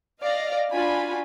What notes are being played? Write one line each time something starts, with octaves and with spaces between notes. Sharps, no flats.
D5 D#5 F5 A#6
D4 F4 F#4 G#5 B5